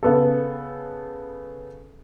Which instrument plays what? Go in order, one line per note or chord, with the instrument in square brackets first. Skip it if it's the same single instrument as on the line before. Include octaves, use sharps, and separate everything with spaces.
[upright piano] C#3 B3 A4